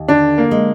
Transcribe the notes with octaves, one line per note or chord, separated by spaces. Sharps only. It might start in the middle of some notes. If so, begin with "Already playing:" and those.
Already playing: D#2
D3 D4
A#3
G#3